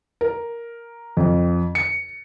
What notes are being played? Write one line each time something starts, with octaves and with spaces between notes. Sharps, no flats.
A#4
F2
C#7